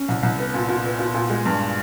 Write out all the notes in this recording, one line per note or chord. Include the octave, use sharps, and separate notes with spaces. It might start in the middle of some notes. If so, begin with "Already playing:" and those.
Already playing: C#4
C2
C2
B3
A#2
A#2
B3
A#2
A#2
G#3
G2